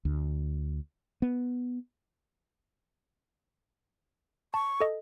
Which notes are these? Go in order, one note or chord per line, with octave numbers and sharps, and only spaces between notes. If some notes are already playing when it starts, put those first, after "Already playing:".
D2
B3
A5 C#6
A4 D#5